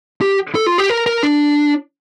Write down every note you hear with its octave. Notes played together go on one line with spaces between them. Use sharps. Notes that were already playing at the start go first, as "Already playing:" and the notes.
G4
A4
F4
G4
A#4
A#4
D4